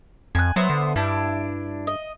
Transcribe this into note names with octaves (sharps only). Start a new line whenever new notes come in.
F2 G#5 F#6
F#3 B3 C5 E5
D3
G2 D4 E4
D#5